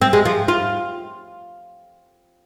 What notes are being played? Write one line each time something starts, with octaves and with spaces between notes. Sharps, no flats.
C4
G#3
F3
F4